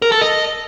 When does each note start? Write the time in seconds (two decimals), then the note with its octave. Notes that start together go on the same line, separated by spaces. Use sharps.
0.02 A#4
0.12 A4
0.22 D#5